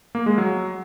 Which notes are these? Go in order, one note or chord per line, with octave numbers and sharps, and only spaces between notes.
A#3
G#3
F#3